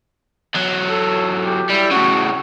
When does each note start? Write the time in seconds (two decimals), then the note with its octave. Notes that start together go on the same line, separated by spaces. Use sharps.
0.54 E2 F#3
0.90 A4
1.45 G4
1.70 G3 E4
1.91 A2 C#3 F#4